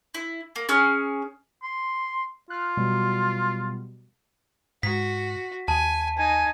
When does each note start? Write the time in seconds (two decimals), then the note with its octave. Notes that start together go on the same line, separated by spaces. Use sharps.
0.15 E4
0.56 A#3
0.69 C#4 G#4 C#6 F6
1.63 C6
2.50 F4 F6 F#6
2.77 B2 F#3 G3
4.83 G#2 F#4 B6
5.68 D#2 G#5 A5
6.18 D#4 G#5